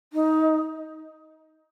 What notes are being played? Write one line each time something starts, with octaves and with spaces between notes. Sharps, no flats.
D#4